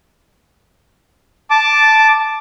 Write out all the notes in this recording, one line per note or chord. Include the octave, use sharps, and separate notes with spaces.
A5 D6